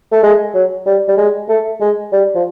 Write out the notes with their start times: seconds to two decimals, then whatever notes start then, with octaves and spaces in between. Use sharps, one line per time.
0.12 A3
0.23 G#3
0.54 F#3
0.86 G3
1.08 G3
1.18 G#3
1.49 A3
1.81 G#3
2.12 G3
2.35 F3